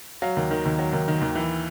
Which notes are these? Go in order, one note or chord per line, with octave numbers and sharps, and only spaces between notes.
F#3 F5
D#2
D#3
D#2
F#3
D#2
D#3
D#2
E3